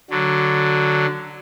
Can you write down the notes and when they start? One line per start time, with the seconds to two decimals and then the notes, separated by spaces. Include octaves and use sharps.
0.10 D3 F#3